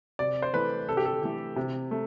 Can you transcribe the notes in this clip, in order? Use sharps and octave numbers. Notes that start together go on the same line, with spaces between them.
C3 D5
C5
E3 A3 B4
C3 A4
G4
A4
E3 A3
C3
A3